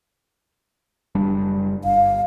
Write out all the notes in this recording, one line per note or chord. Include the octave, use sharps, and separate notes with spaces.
F#1 G3 D4
G1 F5